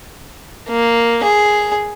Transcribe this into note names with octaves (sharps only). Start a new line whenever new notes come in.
A#3
G#4